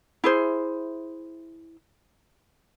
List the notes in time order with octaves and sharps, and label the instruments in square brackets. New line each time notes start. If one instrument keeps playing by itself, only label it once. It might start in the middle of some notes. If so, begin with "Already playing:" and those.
[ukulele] E4 G#4 C5